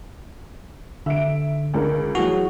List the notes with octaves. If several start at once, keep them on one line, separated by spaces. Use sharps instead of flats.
D3 E5 D7
C#2 D4 A#4
E3 F#3 F#4 G#4